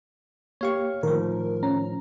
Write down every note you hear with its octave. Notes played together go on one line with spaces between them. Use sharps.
A#3 G4 C#5 F5 C#6
A2 D#3 F3 A#4
C#4 A#5